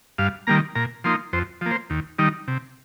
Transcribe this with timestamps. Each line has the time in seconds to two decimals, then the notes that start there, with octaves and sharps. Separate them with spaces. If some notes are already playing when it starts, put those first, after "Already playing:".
0.18 G2 F5
0.47 D#3 G3 A#3 A#5
0.75 A#2 A#5
1.04 F3 A#3 D#4 C6
1.33 F2 C5
1.61 F3 A#3
1.71 C5
1.90 D#2
2.19 D#3 G3 D#4
2.48 C3